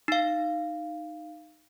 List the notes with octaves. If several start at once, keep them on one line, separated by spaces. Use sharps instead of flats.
D#4 F5